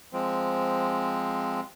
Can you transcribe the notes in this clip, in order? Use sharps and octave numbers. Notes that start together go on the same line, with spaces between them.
F3 G#3 C4